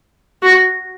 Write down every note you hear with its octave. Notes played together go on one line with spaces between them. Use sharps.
F#4